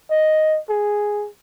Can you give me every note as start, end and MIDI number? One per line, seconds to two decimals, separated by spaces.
0.11 0.58 75
0.70 1.28 68